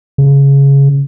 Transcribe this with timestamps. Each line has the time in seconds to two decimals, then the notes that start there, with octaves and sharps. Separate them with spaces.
0.18 C#3